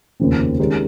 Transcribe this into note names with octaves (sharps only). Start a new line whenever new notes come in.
F1 D#2 C#3 F3 C4
D#3 G#3 C#4 G4 A#4